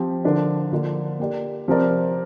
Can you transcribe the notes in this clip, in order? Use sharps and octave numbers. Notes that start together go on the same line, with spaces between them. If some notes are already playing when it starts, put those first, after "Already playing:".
Already playing: F3 C4 G4
D3 F3 D4 A#4
D3 F3 A#3 F4 D5
A#3 G4 D5
C3 F3 C4 A#4 D5